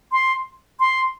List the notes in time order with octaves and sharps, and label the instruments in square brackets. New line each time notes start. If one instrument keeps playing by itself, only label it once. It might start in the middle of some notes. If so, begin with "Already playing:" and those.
[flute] C6
C6